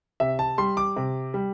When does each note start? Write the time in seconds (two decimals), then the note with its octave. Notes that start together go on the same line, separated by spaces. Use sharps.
0.20 C3 E5
0.39 A5
0.58 G3 C6
0.77 D6
0.96 C3
1.34 G3